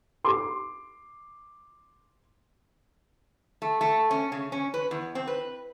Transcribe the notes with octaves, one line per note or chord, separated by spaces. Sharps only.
C6 D6
A3
A3
C#4
C#3
C#4
B4
E2
C4
B4